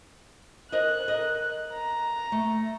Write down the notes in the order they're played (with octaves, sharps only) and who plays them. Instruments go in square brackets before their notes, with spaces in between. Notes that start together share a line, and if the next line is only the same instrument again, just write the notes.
[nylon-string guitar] A#4 C5 D#5 [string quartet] F#6
[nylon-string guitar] A#4 D#5
[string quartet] A#5
[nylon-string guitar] A3